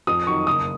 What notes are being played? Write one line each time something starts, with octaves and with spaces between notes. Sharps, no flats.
F2 D#6
D#3 F#3 C#6
F#1 D#6